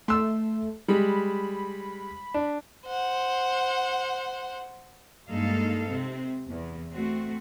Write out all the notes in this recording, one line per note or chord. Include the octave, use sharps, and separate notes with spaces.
A3 C6 E6
G3 G#3 B5
D4
C5 F#5
G2 G#3 A#3 D#4 A4 F5
C3 C4
E2
A3 C4 F#4